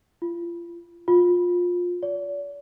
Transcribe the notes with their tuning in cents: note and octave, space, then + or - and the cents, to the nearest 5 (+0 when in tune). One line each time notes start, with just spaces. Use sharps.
F4 -35
F4 +20
D5 -40